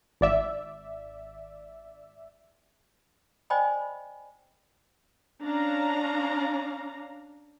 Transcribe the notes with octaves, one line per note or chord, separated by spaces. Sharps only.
G#1 D5 E5
C5 D5 D#5 G5 G#5 B5
C#4 D4 F5 A#5